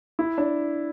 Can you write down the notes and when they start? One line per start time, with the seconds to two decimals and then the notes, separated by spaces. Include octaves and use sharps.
0.19 E4
0.38 D4